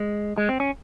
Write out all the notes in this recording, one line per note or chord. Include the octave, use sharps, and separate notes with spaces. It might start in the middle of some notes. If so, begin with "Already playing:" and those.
Already playing: G#3
G#3
C4
C#4